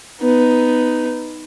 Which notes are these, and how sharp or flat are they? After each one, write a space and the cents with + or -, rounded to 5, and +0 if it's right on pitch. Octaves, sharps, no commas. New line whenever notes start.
B3 +5 D#4 +0